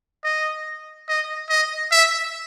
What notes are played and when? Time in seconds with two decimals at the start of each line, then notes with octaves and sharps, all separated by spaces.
0.24 D#5
1.09 D#5
1.49 D#5
1.91 E5